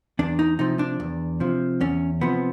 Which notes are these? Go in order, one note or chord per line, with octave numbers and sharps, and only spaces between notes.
E2 D4
D#4
C3 F3 D#4
D4
E2
C3 F3
E2 C#4
C3 F3 B3